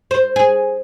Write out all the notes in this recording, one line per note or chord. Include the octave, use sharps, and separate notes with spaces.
C5
G#4